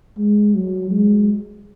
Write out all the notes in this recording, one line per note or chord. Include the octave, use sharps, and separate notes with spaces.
G#3
F#3
G#3